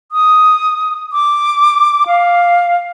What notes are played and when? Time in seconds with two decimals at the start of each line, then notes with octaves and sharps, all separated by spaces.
0.12 D#6
1.12 D6
2.07 F5